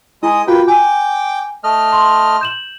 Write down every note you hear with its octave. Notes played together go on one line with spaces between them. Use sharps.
G#3 E4 D#5 A#5 D#6
A#3 F4 F#4 B4 G5
G5 G#5 D6
A3 D#5 F6
C6
G6 E7 F#7